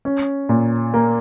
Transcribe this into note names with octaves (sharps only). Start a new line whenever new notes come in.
C#4
A#2
A#3